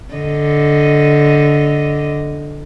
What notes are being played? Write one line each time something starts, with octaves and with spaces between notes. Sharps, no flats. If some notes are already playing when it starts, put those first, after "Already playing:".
D3 D#5